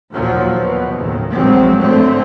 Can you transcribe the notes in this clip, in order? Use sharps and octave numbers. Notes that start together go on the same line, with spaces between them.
D#2 A#2 F3 F#3
B2
F#1 D#2 A2 D#3
A#1 F3 F#3 G#3 C4
G#1 D3 A3 C4